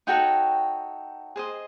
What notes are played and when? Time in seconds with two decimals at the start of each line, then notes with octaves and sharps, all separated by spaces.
0.07 D#4 F#4 A4 C#5 G5
1.36 G#4 C5 D#5